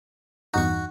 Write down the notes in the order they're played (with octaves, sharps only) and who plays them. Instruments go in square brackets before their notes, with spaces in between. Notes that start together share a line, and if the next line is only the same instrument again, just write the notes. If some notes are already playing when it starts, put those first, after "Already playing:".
[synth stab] E2 G2 D#4 [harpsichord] F#4 C#6